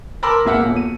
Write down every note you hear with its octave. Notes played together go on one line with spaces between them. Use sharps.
A#4 A5 B5 C6 D6 E6
E1 A#3 E5 F#5 C#7
D#1 B2
D#7